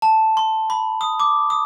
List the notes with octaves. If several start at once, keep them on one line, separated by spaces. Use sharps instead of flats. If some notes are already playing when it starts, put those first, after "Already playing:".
A5
C6
B5
D#6
D6
D#6